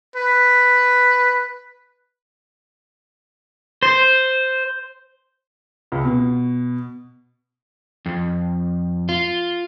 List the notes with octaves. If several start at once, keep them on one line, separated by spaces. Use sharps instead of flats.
B4
C5
C#2
B2
F2
F4